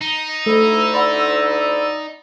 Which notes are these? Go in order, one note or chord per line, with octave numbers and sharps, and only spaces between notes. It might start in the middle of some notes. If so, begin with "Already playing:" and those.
D#4
D2 A3 E4 A4 E6
D5 F#5 B5 C6